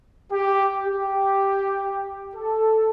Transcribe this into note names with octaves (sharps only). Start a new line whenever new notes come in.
G4
G4
A4